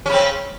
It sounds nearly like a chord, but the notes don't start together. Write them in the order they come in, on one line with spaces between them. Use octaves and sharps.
C#4 C#3 C4